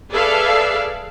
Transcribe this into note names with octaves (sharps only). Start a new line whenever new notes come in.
G#4 A4 B4 D5 E5 F5